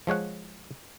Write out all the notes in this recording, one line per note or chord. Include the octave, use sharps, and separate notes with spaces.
F3 G#3 C#5 F#5